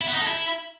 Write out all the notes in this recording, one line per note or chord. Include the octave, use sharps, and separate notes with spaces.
E4
B3
D#4
A4
E4